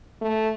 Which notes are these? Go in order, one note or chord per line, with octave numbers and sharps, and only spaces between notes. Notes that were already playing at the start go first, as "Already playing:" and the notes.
A3